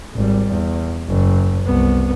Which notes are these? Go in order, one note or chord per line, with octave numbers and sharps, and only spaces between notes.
G#1 G3
E2
F#1
C2 B3